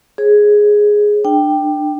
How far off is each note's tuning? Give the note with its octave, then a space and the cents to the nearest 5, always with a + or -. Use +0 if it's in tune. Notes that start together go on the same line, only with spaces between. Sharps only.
G#4 +0 C#5 -40
D4 +25 G5 +0